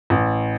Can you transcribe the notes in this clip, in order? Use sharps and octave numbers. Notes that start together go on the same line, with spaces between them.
A1